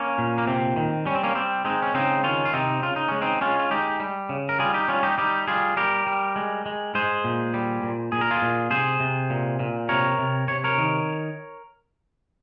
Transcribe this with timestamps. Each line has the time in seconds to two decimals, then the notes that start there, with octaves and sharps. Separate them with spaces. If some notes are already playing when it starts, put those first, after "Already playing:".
Already playing: A#3 C#4
0.18 A#2
0.38 A#3
0.47 C3 C4
0.76 D#3
1.05 G3 C#4
1.14 C4
1.24 A#3 C#4
1.35 G3 C4
1.65 G#3 C4 D#4
1.82 C#4
1.94 C#3 C4 D#4
2.24 D#3 C#4 F4
2.45 F4
2.53 C3 C4 D#4
2.82 C#3 F4
2.96 D#4
3.08 G#3 C#4
3.22 C4 D#4
3.41 G#3 C#4 F4
3.59 F4
3.71 G#3 D#4 G4
4.00 G3
4.29 C#3
4.49 A#4
4.59 G3 F4 G#4
4.74 D#4 G4
4.88 G3 C#4 F4
5.03 D#4 G4
5.18 G3 D#4 G4
5.48 G3 F4 G#4
5.77 G3 G4 A#4
6.07 G3
6.36 G#3
6.66 G#3
6.95 G#3 G#4 C5
7.24 A#2
7.54 G3
7.83 A#2
8.12 A#2 G#4
8.21 A#4
8.31 F4 G#4
8.42 A#2
8.71 C3 G#4 C5
9.00 C3
9.30 A#2
9.59 A#2
9.89 C3 A#4 C#5
10.19 C3
10.48 C3 C#5
10.64 A#4 C#5
10.78 D#3